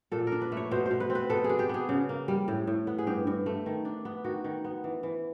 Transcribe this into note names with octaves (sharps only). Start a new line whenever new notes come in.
A#2 A4
D4 A#4
B4
A3
C#5
B2 C5
C5
B2
B4
C4
B4
B2 A4
G#4
D4
G4
B3 G#4
C#3
A#3
G3
A2
A2
B3
G#4
G2 G4
G2
A3
D#3
D4
B3
D#3 F#4
D#3
B3
E3
E3